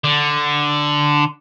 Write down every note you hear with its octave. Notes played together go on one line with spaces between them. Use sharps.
D3